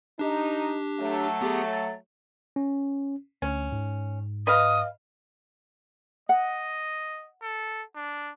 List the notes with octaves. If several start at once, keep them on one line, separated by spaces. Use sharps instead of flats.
D4 D#4 G4
F#3 A3
B3 G4 G#4
A6
C#4
D2 C#4
G#2
B4 D#5 F5 D#6
D#5 F#5
A4
D4